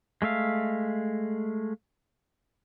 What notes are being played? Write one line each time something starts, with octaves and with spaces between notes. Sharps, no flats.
G#3 A3 E5 F5